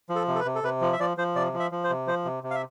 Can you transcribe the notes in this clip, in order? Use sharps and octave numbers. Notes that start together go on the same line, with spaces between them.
F3
A4
C3
A4
B4
C3
A4
C3 B4
F3
E5
F3 D5
F3 C5
C3 D5
F3
E5
F3
C5
C3
F3 C5
C3
C3
F5
E5